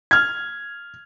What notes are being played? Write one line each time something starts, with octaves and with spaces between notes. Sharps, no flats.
F6 G#6